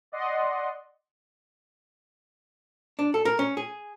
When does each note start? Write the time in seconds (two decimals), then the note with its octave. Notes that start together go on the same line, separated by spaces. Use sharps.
0.12 D5 D#5 F#5 C6
2.99 D4
3.14 A4
3.25 A#4
3.39 C#4
3.57 G#4